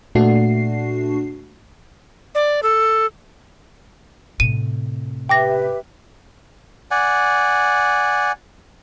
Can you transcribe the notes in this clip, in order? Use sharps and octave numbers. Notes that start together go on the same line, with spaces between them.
A#2 A3 D4 F#4 C7
D5
A4
A2 C3 D#7
G4 B4 E5 G5 D6 A#6
D5 F#5 G#5